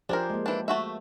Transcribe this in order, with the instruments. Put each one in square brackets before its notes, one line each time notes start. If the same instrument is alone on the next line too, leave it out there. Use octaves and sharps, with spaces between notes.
[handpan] F3 G4 C5 [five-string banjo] D4 G#4 A#4
[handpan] G#3 A#3
[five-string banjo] E3 D4
A3 F#4 E5